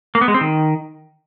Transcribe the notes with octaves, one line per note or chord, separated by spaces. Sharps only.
A#3
B3
G#3
C4
D#3